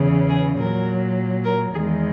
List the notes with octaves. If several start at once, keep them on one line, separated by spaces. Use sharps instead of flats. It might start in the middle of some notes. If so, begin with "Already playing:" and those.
Already playing: E2 C#3 E3
G#4
A#2 F#3 A#4
A#4
E2 D#3 G#3 G#4